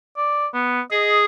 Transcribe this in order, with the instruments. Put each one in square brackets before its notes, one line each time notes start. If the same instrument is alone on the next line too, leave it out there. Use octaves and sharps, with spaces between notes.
[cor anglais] D5
B3
[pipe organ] G#4 [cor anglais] D#5